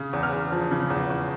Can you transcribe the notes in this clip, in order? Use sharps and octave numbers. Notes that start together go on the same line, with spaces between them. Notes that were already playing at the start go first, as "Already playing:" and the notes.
Already playing: C#3
E2
F6
E2
F3
C#3
E2
E2